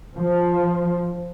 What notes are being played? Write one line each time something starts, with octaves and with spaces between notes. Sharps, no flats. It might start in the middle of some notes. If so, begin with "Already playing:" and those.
F3